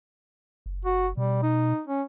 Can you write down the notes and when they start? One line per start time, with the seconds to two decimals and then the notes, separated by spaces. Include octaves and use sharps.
0.66 F#1
0.85 F#4
1.17 B2 G3
1.43 D#4
1.87 C#4